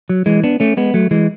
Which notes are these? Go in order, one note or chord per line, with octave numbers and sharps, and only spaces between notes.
F#3
E3 G#3
B3 D4
A3 C#4
G#3 B3
F#3 A3
E3 G#3